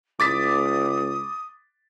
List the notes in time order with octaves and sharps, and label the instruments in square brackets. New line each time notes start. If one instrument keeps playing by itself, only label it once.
[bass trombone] C#2 [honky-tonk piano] D6 A6 B6 [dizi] D#6